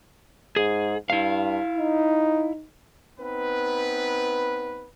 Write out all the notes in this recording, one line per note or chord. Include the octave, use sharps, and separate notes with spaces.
G#2 G#4
G2 E4 F5
D#4
B3 C4 D#4 B4